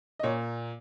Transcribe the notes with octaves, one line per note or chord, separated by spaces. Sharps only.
D#5
A#2 C#5